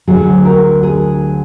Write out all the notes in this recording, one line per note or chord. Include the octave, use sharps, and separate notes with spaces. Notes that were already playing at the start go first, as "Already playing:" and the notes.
D2 D3 F#3 G#4
A#4
G#4